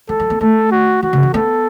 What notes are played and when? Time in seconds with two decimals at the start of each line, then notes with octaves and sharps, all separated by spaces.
0.09 F#3 A4
0.20 F#3
0.30 B3
0.40 A3 A4
0.71 F#4
1.03 E3 F#4
1.13 C#3
1.23 E3
1.34 B3 A4